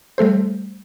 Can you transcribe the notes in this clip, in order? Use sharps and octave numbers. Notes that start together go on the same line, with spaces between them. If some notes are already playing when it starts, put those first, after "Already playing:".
G3 A3 A4 C5